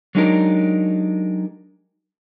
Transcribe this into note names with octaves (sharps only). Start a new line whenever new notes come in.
F#3 G#3 D4 D#4 G4 A#4